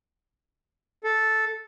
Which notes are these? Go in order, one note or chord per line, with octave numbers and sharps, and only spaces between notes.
A4